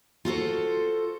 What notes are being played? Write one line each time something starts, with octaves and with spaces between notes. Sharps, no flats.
F4 F#4 A4 C5